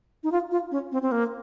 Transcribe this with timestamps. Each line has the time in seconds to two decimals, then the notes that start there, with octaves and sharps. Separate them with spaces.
0.24 D#4
0.32 F4
0.51 F4
0.71 C#4
0.92 C4
1.02 C4
1.12 A#3